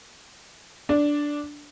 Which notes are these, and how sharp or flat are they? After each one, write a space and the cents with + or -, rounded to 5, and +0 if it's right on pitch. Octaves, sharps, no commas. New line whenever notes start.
D4 -5